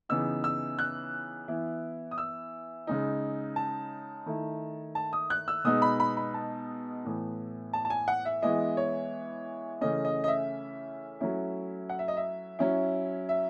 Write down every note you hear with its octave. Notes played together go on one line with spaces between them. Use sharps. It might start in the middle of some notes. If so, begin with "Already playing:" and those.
C#3 E3 B3 D#4 E6
E6
F#6
E3 B3 E4
D#6
E6
C#3 G#3 D#4
A5
D#3 A3 E4
A5
D#6
F#6
E6
B2 G#3 B3 D#4 D#6
B5
B5
B5
A5
A2 E3 B3
A5
A5
G#5
F#5
E5
E3 G#3 B3 E4 D#5
C#5
C#3 E3 A3 C#4 D#5
D#5
D#5
E5
F#3 A3 C#4 E4
F#5
E5
D#5
E5
F#3 C#4 E4
E5